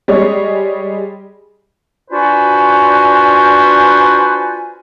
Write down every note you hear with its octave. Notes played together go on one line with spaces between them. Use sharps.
G3 G#3 C#5 D#5
D4 F4 F#4 B4 C5 G#5